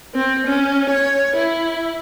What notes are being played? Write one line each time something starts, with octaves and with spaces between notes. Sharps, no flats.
C4
C#4
C#5
E4